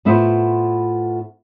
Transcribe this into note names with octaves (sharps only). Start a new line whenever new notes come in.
A2 B3 E4 F4 C5 F#5